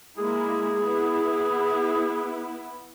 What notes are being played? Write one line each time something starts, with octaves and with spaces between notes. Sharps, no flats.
G#3 A#3 E4 G#4
B3 E4